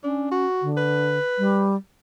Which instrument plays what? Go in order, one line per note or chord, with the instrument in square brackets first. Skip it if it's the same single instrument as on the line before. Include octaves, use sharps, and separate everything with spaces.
[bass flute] C#4 [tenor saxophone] D4
[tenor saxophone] F#4
[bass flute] D3
[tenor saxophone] B4
[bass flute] G3